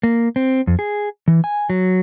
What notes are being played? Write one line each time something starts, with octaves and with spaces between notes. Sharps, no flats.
A#3
C4
F2
G#4
E3
G#5
F#3